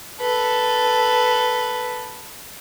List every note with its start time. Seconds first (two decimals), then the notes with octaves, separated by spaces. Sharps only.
0.21 A4 B4